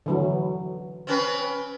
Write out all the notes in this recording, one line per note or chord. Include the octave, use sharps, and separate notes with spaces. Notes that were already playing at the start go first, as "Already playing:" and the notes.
D3 E3 F#3
C4 C#4 B4